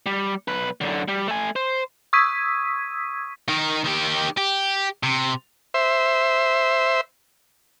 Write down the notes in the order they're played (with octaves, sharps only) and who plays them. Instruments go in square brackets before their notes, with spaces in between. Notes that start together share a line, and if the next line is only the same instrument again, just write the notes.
[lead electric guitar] G3
B1 B4
F#2 D3
G3
A3 G#5
C5
[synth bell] C#6 D#6 E6 G#6 B6 D#7
[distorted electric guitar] D#3 A#4
D#3 G4
G4
C3
[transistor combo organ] C5 E5